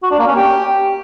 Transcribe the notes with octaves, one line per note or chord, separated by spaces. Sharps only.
F#4
D4
A#3
C#4
G4